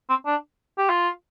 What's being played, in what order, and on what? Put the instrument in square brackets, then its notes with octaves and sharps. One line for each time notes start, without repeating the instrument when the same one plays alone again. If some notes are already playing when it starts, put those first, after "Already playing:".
[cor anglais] C4
D4
G4
F4